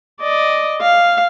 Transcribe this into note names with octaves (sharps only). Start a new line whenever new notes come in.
D5 D#5
F5